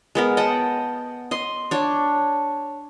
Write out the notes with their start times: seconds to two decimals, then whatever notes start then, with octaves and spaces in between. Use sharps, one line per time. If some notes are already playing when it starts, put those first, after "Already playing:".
0.15 G#3 B3 A#4
0.37 D#5 F#5 G5 A5
1.31 D#5 C6
1.71 D4 C#5